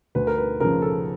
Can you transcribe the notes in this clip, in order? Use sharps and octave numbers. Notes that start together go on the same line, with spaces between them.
D2 B4
A#4
B4
C#3 F3 A#4
A4